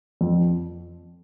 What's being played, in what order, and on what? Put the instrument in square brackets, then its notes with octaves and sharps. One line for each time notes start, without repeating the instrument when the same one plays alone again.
[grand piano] F2